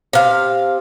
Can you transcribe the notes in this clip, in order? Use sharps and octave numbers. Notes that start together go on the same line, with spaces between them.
C3 F5